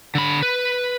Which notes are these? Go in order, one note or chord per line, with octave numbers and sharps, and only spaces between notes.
D3 B5
B4